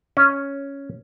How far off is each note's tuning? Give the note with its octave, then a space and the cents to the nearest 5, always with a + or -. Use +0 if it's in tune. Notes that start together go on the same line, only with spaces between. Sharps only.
C#4 +0